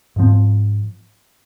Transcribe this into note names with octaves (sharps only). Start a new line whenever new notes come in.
G#2 F3 C4